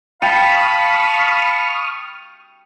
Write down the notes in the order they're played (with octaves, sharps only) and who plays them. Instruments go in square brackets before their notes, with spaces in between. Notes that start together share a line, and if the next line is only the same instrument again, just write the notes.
[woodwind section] F5 A5 B5 [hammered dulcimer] G5 [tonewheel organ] C#6 D#6 F6